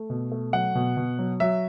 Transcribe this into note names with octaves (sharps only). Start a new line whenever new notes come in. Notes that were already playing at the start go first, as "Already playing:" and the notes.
Already playing: A3
B2
A3
F#3 F#5
B2
B2
F#3
F#3 E5